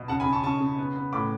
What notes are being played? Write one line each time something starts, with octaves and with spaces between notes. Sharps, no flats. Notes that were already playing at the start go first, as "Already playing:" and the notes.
Already playing: B2
C#3 F#5 A5
G#5 B5
C#3
A5 C#6
C#3 A5 C#6
C#3
B3
B3
A2 B5 D6